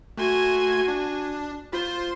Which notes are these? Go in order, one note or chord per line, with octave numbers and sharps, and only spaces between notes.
A3 F#4 G#5 C6 G#6
D4
F4 C5 C6